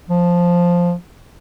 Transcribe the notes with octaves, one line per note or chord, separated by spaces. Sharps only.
F3